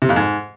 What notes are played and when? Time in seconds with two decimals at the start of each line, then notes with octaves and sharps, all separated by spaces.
0.02 C3
0.09 F2
0.16 G#2